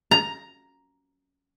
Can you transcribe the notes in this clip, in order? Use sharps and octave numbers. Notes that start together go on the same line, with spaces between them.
A#5